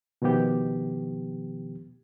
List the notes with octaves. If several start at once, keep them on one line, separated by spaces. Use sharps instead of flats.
B2 D#3 F3 B3 G4